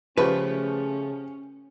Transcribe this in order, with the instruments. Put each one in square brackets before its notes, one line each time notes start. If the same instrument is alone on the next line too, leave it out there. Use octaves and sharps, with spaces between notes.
[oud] C#3 A3 [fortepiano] F3 G4 [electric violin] C#4 [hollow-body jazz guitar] B4